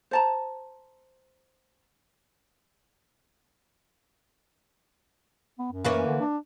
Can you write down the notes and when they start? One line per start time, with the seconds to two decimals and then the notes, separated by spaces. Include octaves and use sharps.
0.11 C5 A5 A#5
5.59 B3
5.72 F#2
5.85 E3 A#3 C#4
6.06 D3
6.21 D4